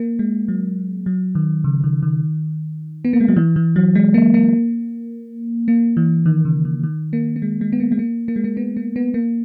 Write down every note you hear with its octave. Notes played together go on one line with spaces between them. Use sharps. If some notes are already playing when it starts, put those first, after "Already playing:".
Already playing: A#3
G#3
F#3
F#3
D#3
C#3
D#3
D#3
B3
A#3
G#3
F#3
E3
E3
F#3
G#3
A#3
A#3
A#3
E3
D#3
C#3
D#3
D#3
A#3
A#3
G#3
G#3
B3
A#3
G#3
A#3
A#3
G#3
A#3
B3
A#3
B3
A#3